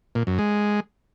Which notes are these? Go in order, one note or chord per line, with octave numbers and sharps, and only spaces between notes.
A#2
F#2
G#3